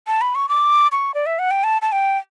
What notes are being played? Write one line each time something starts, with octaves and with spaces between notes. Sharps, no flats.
A5
B5
C#6
D6
C#6
D5
E5
F#5
G5
A5
A5
G5